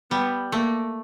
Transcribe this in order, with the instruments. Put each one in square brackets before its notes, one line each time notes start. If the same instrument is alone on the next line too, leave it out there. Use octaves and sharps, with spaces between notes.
[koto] G3 [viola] B3
[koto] A3 [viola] A#3